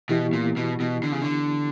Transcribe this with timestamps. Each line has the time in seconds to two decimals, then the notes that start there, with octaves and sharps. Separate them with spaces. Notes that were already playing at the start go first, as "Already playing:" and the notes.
0.09 B2 E3 B3 E4 G4
0.33 A#2
0.57 B2
0.80 B2
1.03 D3
1.12 C#3
1.22 D3